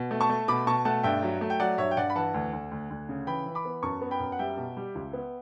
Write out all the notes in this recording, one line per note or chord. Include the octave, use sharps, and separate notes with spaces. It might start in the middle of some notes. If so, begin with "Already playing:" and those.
Already playing: B2
A3
A5 C#6
A3
B2 B5 D6
B2 A5 C#6
A3 F#5 A5
G2 E5 G5
F#3
A3
G5
F#3 D5 F#5
G2 C#5 E5
G5
G2 D5 F#5
B5
E3 F#5 A5
D2
D2
D2
D2
C#3
E3 G5 B5
E3
B5 D6
B3
F#2 A5 C#6
B3
G5 B5
F#2
F#5
G3 E5 G5
B2
G3
C#2
B3